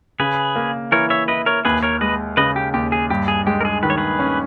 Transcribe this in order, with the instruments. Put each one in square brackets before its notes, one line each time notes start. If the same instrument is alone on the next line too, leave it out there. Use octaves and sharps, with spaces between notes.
[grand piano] C#3 [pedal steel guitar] G#4 B4
[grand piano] A#3
[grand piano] E3 [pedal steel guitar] A#4 C#5
[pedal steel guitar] C#5 E5
[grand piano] E4 [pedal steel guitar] B4 D#5
[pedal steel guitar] A#4 C#5
[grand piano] D#2 [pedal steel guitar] G#4 B4
[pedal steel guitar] A#4 C#5
[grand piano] G#3 [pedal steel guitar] B4 D#5
[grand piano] C#3 [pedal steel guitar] B4 D#5
[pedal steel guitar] G4
[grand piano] D#2 [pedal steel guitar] G4
[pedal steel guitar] G#4
[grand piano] G2 [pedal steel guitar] G4
[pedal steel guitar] G#4
[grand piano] G#3 [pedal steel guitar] G4
[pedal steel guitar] A#4
G#4
[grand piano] D#3 [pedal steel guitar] B4
[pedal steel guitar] C#5
G#4 B4
[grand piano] C#4